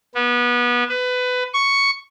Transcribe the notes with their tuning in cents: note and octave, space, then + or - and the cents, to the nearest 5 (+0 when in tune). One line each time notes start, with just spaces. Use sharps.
B3 -25
B4 +20
C#6 +5